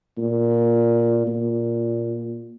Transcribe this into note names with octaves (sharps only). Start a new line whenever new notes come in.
A#2
A#2